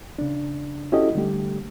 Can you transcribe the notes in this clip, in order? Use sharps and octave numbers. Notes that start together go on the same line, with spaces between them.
C#3 D4
C#4 E4 F#4 G4 A4 D#5
D3 G3 A3 G4